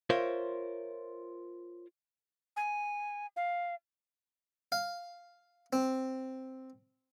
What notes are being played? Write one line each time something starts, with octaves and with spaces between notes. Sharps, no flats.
F4 A#4 C5 C#5 E5
G#5
F5
F5
C4